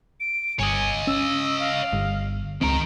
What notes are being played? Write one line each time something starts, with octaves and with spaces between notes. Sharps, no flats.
D7
G1 C#5 D#5 G#5
C#4 E6
F5
G1
C#2 D#3 C4 A#5 D7